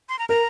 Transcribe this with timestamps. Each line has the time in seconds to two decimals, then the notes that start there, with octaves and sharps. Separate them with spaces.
0.09 C6
0.19 A#5
0.29 A#4 A#5